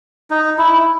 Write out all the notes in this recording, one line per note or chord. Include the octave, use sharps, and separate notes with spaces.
D#4
E4